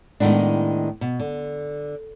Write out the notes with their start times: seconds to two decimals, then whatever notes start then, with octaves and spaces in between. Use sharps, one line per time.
0.20 A2 D#3 F3 G#3 B3 D4
1.01 B2
1.20 D3